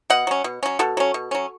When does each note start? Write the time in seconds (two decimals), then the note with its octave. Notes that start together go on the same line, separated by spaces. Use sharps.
0.10 B2 D#5 F#5
0.27 F#3 C#4
0.44 B2
0.63 F#3 C#4
0.79 B2 F#4 A4
0.97 F#3 C#4
1.14 B2
1.31 F#3 C#4